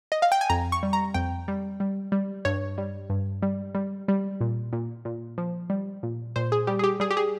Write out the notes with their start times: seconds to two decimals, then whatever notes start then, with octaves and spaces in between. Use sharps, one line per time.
0.12 D#5
0.22 F5
0.32 G5
0.41 G#5
0.50 F2 A#5
0.72 C#6
0.83 G3
0.93 A#5
1.14 F2 G5
1.48 G3
1.80 G3
2.12 G3
2.45 G2 C#5
2.78 G3
3.10 G2
3.42 G3
3.75 G3
4.08 G3
4.41 A#2
4.73 A#2
5.05 A#2
5.38 F3
5.70 G3
6.03 A#2
6.36 A#2 C5
6.52 G#4
6.67 G3 G4
6.79 G#4
6.84 G4
7.00 G3 G#4
7.11 G4
7.17 G#4